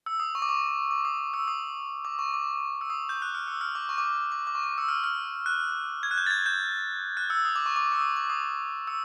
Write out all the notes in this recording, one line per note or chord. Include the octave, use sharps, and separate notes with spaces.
E6
D#6
C#6
D6
C#6
D6
D#6
E6
D#6
D6
C#6
D6
E6
D#6
G6
F#6
F6
E6
F6
D6
C#6
D6
C#6
D6
D6
C#6
D6
E6
F6
F6
F#6
G#6
F#6
G6
A6
G#6
G6
F#6
E6
D#6
D6
C#6
D6
E6
D#6
D6
D#6
E6